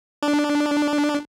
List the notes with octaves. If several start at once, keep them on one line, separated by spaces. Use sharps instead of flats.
D4